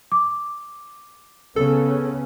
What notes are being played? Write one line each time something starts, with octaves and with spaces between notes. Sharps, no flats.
D6
C#3 B3 C#4 A4